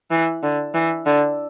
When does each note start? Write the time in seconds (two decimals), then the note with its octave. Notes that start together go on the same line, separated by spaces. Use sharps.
0.11 E3
0.43 D3
0.74 E3
1.06 D3